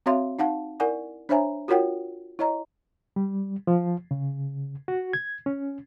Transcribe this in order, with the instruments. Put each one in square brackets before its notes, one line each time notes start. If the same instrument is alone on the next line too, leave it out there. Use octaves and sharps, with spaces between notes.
[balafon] C4 F#4 C#5 E5 F5 C6
D#4 F5 F#5 A5
E4 A#4 D5 F#5 G#5
D4 C5 C#5 E5 G#5 A#5
F4 F#4 A#4 C#5 F#5 G5
E4 C#5 D#5 A#5
[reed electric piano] G3
F3
C#3
F#4
G#6
C#4